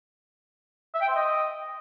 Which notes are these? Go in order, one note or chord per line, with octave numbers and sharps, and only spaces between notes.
E5
G5
C5
D#5